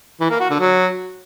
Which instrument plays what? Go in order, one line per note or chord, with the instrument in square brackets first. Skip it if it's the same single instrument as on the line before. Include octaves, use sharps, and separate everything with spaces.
[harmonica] E3
A#3
F#4
D3
F#3